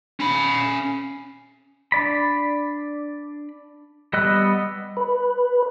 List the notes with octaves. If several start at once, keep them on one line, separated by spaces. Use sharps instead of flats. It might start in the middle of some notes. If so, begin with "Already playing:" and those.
C#4 B5
D4 D5 B5
G3 B3 D#5 E6 F#6
B4